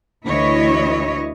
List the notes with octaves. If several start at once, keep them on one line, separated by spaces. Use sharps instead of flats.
D2 E3 E4 C#5 D#5